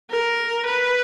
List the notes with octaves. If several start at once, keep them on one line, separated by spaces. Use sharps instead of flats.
A#4
B4